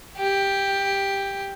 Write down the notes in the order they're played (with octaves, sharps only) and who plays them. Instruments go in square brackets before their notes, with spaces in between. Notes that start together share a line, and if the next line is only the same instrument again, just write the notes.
[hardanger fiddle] G4